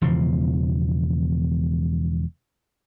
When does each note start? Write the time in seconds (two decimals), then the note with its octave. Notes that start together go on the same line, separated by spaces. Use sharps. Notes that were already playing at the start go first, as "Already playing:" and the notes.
0.02 E1 E2 C#3 F3